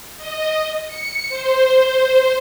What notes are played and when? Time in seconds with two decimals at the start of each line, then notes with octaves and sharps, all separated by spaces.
0.18 D#5
0.87 C#7
1.29 C5